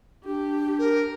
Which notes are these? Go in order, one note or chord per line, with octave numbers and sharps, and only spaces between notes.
D4 G4
A#4